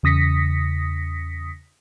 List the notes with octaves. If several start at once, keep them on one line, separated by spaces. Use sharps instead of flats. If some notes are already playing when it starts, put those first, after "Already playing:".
E2 C#3 D#6 A#6 B6 C#7